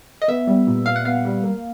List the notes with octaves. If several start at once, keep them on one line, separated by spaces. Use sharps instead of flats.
D#5
B3 E5
G3
A#2
A#2 F5
F#5
B3 F5
G3
A#3